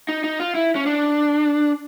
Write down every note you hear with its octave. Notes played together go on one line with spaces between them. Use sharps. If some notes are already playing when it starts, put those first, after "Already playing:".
D#4
D#4
F4
E4
C#4
D4